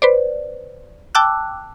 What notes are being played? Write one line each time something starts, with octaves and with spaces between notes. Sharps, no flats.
B4 C5 D5
G5 A5 D6 E6 F#6